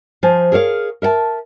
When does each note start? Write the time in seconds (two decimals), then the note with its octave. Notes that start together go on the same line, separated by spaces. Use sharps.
0.23 F3 C5 G#5
0.52 G#4 A#4 C#5 F5
1.02 A#4 E5 F#5 A5